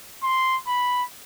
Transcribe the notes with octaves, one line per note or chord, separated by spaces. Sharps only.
C6
B5